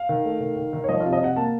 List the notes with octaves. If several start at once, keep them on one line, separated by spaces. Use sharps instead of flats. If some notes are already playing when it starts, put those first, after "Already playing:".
Already playing: F5
D#3
A3
D#3
D#3
D#3
C#5
F3 D#5
C3 F4
D#5
C3 F#5
A#3 A5